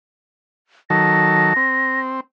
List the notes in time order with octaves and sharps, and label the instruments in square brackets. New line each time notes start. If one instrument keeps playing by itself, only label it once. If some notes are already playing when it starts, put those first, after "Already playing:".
[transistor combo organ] D#3 F#3 A4 [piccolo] A#6
[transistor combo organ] C4